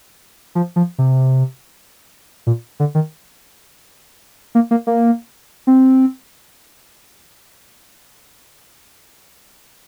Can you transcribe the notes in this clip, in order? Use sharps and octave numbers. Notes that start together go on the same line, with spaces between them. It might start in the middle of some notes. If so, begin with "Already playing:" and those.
F3
F3
C3
A#2
D3
D#3
A#3
A#3
A#3
C4